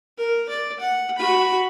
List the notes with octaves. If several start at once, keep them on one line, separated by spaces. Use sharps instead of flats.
A#4
D5
F#5
F#4 B5